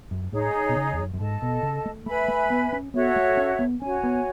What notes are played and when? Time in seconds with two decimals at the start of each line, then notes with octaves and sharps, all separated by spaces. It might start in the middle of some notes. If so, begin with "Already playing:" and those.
0.11 F#2
0.32 A2 D#4 G#4 C#5
0.69 B2
0.76 C#3
0.93 E2
0.98 F#2
1.14 F#2
1.20 G#2 A4 D#5 A5
1.42 B2
1.63 C#3
1.86 A3
2.06 A3 B4 E5 G#5 B5
2.28 A3
2.50 B3
2.73 C#4
2.94 B3 F#4 A4 C#5 E5
3.16 A3
3.37 C#4
3.59 B3
3.81 C#4 F#4 C#5 G#5
4.04 B3